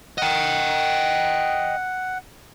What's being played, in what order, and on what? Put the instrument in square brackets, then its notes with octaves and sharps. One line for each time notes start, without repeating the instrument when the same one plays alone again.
[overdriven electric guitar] D#5 G5 [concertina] F#5